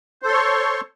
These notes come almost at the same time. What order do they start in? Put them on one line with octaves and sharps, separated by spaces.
C5 A4 C6 C#5 C#6